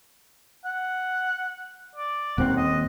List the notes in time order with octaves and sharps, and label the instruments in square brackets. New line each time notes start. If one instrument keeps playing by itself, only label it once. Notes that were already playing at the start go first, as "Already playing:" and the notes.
[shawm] F#5
D5
[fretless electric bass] D#1 D#2 C4 [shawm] F#5
[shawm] D#5